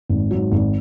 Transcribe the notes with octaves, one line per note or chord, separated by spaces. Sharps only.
G#1
G#2 F#3
G#1